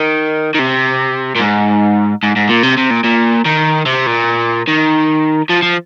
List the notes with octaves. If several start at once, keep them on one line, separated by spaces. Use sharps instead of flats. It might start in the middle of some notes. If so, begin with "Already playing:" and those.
Already playing: D#3
D#3
C3
A#2
G#2
G#2
G#2
A#2
C3
C3
A#2
A#2
D#3
C3
A#2
D#3
F3
F3